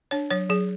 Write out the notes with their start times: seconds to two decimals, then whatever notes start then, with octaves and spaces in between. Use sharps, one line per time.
0.11 D4 C#5
0.31 F#3 C#5
0.49 F#3 G#4